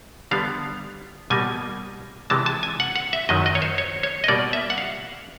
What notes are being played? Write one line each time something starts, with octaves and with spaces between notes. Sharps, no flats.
D3 G3 B3 F5
B2 G3 A#3 G#5
C3 E3 G#3 A5
A5
G#5
F#5
F#5
E5
F#2 D#3 F#3 D#5
D#5
C#5
C5
C#5
C#5
D#5
B2 G3 A#3 D5
E5
F#5
F5